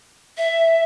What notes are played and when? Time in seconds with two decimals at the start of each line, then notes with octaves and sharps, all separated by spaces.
0.38 E5